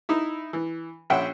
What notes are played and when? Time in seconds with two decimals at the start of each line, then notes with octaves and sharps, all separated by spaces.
0.09 D#4 E4
0.53 E3
1.10 A#1 C#4 E5 F#5 G5